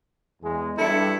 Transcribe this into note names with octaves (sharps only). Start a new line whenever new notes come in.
E2 G#3
G2 E4 A4 C#7